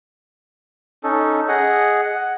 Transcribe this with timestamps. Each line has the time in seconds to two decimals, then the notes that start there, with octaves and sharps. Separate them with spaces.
1.04 C#4 D#4 A4
1.48 G#4 D#5 F#5
2.03 F#5